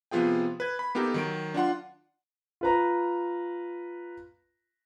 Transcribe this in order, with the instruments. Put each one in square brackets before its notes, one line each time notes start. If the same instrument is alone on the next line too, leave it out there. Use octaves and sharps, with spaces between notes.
[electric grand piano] C3 F3 B3 F4 G#4 G5
B4 G#6
B5
A#3 B3 D#4 G4 A4 A#4
D#3 F#3 D7
D4 F4 F#5 C6
[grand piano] F4 B4 A#5